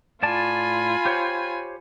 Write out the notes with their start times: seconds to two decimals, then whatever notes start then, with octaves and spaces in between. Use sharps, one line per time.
0.23 A2 F4 D5 G#5 A5 B5
1.05 G4 C5 C#5